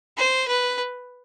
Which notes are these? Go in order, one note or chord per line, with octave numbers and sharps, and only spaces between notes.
C5
B4